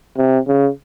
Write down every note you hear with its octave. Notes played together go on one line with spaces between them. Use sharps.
C3
C#3